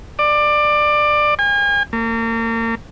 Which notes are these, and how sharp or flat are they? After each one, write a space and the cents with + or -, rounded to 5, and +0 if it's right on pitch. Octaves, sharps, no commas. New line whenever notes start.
D5 +20
G#5 -40
A#3 -35